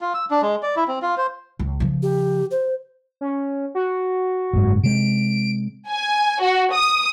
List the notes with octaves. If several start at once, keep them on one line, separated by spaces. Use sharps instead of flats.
F4
E6
D4
G#3
D5
E4
C4
F4
C5
C#2
C#3 F3
G4
C5
C#4
F#4
F#1 G#2
C3 G#3 D7
G#5
F#4
D#6